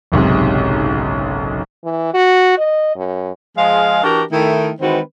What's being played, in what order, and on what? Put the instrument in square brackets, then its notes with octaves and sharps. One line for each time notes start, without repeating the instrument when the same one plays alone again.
[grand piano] F#1 B1 G#2 C3
[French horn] E3
F#4
D#5
F#2
[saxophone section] F3 G#3 G#4 D#5 F5
E3 D4 F#4 G4 A#4
D#3 A3 E4
D#3 E3 G#3 C4 F#4 B4